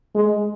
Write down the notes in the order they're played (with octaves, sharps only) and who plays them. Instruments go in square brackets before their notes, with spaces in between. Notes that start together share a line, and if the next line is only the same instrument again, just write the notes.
[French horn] G#3